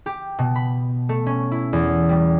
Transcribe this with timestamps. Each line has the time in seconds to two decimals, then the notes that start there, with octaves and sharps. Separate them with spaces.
0.06 G4
0.39 B2
0.55 B5
1.09 A3
1.26 C#4
1.51 E4
1.73 E2
2.09 G3